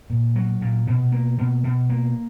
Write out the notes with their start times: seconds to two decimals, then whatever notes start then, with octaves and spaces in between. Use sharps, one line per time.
0.10 A#2
0.36 F#3
0.62 A#2
0.87 B2
1.12 A#3
1.38 B2
1.64 B2
1.90 A#3